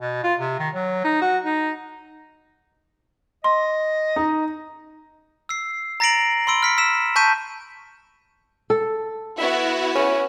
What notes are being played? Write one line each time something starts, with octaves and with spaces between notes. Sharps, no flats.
B2
F4
C3
D#3
F#3
D#4
F#4
D#4
D#5 C6
D#4
E6 C7
A#5 A6 A#6 C7 D7 F#7
B5 C6 E6 D7
F6 B6 C#7
E6 B6 E7
A5 C#6 G6 B6 D#7
A4
B3 E4 F#4 E5
C#4